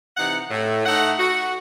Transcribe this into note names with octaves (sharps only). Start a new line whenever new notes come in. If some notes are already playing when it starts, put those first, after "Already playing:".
C3 E3 D#4 F#5
A2
A3 D#4 F#5
F#4